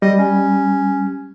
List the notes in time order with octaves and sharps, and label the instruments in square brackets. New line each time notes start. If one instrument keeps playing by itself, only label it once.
[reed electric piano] G3 [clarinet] D#5
[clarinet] C#4